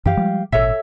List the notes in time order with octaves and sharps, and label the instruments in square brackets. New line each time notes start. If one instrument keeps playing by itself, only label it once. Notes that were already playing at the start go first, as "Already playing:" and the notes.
[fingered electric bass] F#2 E3 [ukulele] G4 F5
[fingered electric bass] F3 G3 G#3
[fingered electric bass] G#1 A#2 [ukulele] A4 C#5 E5